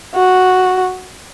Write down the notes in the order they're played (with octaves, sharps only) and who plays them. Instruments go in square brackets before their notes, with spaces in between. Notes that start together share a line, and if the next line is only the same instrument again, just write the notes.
[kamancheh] F#4